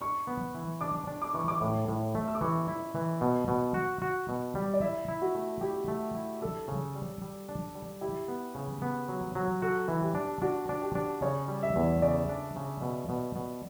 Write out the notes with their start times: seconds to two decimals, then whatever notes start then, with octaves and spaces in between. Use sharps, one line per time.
0.01 D4 C#6
0.27 B3
0.55 E3
0.81 D4 D6
1.07 D4
1.22 D6
1.34 E3 C#6
1.48 D6
1.61 A2
1.89 A2
2.15 A3
2.28 E6
2.35 D6
2.41 E3 C#6
2.68 E4
2.95 E3
3.21 B2
3.48 B2
3.74 F#4
4.02 F#4
4.29 B2
4.55 G3
4.74 D5
4.81 E4 E5
5.08 E4
5.22 F#4
5.35 A3
5.61 E4 G4
5.88 A3
6.15 E4
6.41 D4 A4
6.68 C#3
6.95 G3
7.22 G3
7.49 D4
7.75 G3
8.01 E4 G4
8.28 B3
8.55 C#3
8.82 B3
9.09 F#3
9.35 F#3
9.62 F#4 A4
9.88 E3
10.02 G4
10.15 D4
10.42 D4 F#4
10.69 D4
10.82 G4
10.95 D4
11.22 C#3 C#5
11.48 G3
11.63 E5
11.76 E2
12.02 C#3 D5
12.29 D4
12.56 C#3
12.82 B2
13.09 B2
13.36 B2